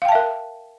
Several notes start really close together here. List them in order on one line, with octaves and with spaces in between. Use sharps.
F5 G5 A5 E5 A#4